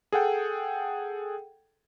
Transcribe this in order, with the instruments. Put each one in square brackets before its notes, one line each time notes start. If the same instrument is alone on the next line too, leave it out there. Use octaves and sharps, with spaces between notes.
[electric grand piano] G#4 A4 F#5 G5